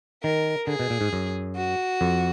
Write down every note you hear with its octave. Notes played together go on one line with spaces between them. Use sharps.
D#3 A#4
D3 G#4
B2
A#2
G#2
F#2
F#4
F2